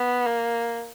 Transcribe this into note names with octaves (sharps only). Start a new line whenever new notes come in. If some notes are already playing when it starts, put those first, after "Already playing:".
Already playing: B3
A#3